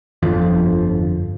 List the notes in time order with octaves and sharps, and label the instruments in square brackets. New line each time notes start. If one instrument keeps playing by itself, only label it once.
[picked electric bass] G1 F2 F3